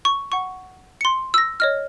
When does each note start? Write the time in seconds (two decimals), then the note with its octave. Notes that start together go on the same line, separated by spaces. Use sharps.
0.05 C#6
0.32 F#5 C#6
1.01 C6 C#7
1.34 E6 A#6
1.60 C#5 D#5 F6